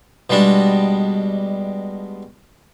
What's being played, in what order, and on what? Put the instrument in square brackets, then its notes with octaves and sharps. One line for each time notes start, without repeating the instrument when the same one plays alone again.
[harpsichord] B2 G3 G#3 D4